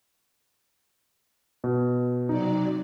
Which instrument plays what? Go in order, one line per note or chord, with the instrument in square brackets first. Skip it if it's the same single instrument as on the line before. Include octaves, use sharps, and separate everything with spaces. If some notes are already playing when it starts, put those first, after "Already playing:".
[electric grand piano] B2
[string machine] C3 F#3 D5 [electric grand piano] D#4